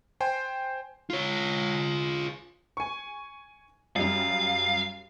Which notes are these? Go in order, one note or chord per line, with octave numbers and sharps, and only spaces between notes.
C5 G5 G#5 C6
F4 C#5
G#5 C#6
F#2 G3 F5